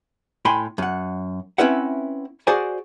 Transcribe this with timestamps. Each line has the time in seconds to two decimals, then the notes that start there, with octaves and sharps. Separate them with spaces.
0.45 A2 G5 G#5 B5 C6
0.78 F#2 F#5
1.58 C4 C#4 E4 B4 E5 F#5
2.47 F#4 G#4 C5 D5 F#5 G#5